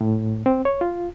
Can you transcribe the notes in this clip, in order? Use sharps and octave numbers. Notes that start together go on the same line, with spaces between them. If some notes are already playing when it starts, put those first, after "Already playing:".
A2
C4
C#5
F4